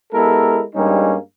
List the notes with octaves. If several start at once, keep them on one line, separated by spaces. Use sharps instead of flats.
G#3 B3 E4 G4 A4 A#4
G2 G3 G#3 A#3 C#4 D#4